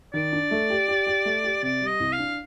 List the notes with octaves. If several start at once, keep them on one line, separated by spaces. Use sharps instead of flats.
D#3 D5
D4
A3
G4
G4
G4
A3
G4
C3 D5
G3
D#5
C2
F5
D4